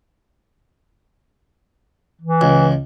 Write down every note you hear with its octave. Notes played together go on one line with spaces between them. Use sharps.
E3
C#2